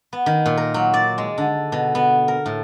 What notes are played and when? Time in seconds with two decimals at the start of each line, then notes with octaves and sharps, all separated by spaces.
0.13 B3
0.26 D#3
0.46 A#2
0.57 A#4
0.74 F#3
0.94 D5
1.18 G#3
1.38 D3
1.72 B2
1.95 B3
2.28 A#4
2.46 A2